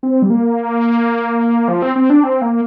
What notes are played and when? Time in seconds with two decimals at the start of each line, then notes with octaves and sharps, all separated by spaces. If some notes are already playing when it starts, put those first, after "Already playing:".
0.03 C4
0.22 G3
0.30 A#3
1.68 F3
1.82 C4
1.96 C4
2.10 D4
2.24 C4
2.42 A#3